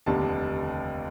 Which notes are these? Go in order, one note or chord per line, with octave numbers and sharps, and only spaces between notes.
F1 D#2 D3 G3 A5